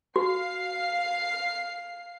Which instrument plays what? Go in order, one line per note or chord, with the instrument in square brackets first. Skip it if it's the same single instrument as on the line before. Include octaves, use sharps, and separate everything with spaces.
[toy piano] F#4 [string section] F5 C7